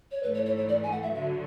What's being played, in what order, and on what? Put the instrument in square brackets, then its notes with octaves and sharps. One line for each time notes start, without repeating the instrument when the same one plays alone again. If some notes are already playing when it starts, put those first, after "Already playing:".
[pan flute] C#5
[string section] G#2 E3 A3 [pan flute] B4
[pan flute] C#5
C#5
C#5
D5
G#5
F#5
E5
[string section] D3 F#3 [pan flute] E5